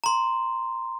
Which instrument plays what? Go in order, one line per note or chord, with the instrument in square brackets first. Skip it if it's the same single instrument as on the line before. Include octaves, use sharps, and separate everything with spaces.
[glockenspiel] A#5 C6